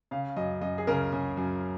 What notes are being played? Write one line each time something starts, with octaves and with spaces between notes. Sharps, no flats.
C#3 F5
F#2 D#5
F#2 D#5
G#4
C#3 A#4
C#3
F#2